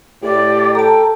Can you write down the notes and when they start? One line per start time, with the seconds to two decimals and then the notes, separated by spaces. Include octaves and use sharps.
0.23 A2 G4 D5
0.75 A4 G5 A5 A#5